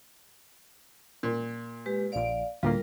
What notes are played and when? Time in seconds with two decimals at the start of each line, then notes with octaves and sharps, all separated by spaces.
1.23 A#2
1.86 G#3 G4 B4
2.12 A#1 D5 F5 D7
2.63 D2 A2 G3 A#3 F4 A#4